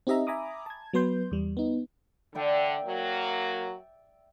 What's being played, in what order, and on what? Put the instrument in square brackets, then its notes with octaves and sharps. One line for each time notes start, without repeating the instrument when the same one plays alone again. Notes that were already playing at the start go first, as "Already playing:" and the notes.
[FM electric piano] C4 D#4 G4 D#5 E5 A#5
E5 G#5 A#5 B5 D6 D#6
A5 G#6
F#3 B3 B4 C6 G6
E2 G3
B3 D#4
[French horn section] D3 [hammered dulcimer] D5 E5 G5
[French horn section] F#3 A#3